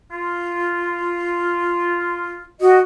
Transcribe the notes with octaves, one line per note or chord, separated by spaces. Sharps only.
F4
F#4 D#5